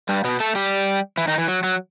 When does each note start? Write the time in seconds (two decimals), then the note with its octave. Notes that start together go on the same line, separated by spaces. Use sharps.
0.09 G2 G3
0.24 B2 B3
0.40 A3 A4
0.55 G3 G4
1.17 E3 E4
1.28 D#3 D#4
1.38 E3
1.48 F#3
1.63 F#3